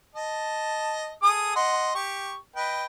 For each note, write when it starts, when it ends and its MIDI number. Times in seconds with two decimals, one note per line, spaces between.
0.15 1.13 75
0.15 1.13 81
1.22 1.54 68
1.22 1.54 69
1.22 1.54 87
1.56 1.91 75
1.56 1.91 78
1.56 1.91 84
1.95 2.34 67
1.95 2.34 85
2.56 2.85 71
2.56 2.85 75
2.56 2.85 79